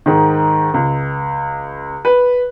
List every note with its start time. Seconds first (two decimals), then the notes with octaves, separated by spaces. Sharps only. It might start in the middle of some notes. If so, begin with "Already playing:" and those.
0.06 G#2 D#3
0.74 C#2
2.05 B4